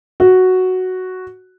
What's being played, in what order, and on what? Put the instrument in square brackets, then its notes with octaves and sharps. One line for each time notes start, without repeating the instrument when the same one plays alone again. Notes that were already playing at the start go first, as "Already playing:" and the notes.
[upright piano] F#4